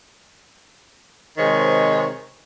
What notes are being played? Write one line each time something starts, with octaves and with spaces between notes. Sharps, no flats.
C3 D#3 G#3 C5 C#5